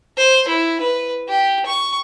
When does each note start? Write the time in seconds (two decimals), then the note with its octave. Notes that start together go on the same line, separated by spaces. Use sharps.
0.17 C5
0.48 E4
0.81 B4
1.29 G4
1.66 C#6